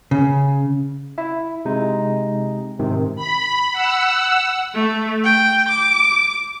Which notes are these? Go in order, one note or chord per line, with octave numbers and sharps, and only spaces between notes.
C#3
E4 E5
C3 G#3 D#4
G#2 C3 D#3
B5
F#5 E6
A3
G5
D6